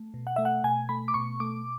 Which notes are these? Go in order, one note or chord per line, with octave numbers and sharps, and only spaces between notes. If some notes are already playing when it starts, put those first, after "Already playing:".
Already playing: A3
B2
F#5
A3 E5
F#5
B2 G#5
A3 B5
D6
B2 C#6
A3 D6